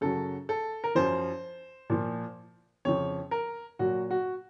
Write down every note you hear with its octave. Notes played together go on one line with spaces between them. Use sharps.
F#2 C#3 F#3 A4
A4
A#4
F#2 F3 C5
A#2 F3
F2 C#3 F3 C#5
A#4
A#2 F#3 F#4
F#4